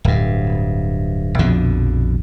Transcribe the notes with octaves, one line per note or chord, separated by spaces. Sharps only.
D1 G2
A#1 F2 B2 D3